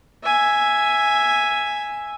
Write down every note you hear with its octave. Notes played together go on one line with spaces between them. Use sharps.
E5 G#5